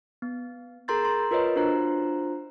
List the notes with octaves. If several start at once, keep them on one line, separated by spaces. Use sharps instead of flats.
B3
G#4 A#4 A#5 C6 G6 A6
A#5 C6
F4 A#4 B4 C#5 D#5
D4 F4 F#4 C5 A#5